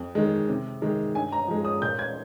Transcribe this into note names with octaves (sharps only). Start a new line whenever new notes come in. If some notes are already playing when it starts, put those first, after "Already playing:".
Already playing: F2
D#3 G#3
C3
D#3 G#3
G2 G#5
A#5
F3 G#3
D#6
A#2 G6
G#6